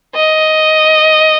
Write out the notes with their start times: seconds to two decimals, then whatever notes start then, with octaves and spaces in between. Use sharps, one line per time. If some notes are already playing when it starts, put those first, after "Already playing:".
0.15 D#5